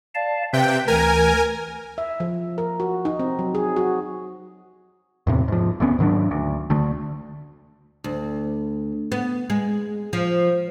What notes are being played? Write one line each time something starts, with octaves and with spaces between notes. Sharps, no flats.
D5 F5 A5
C3 B4 E5 G5
D2 E3 A#4 G#5
E5
F3
A#4
F#4
D#4
C4
F#3
G#4
F#4
E2 A2 C3
G#2 F3
D2 D3 B3 C#4
G#2 D#3 F#3 D4
D2
D2 D3 A3
D2
B3
G#3
F3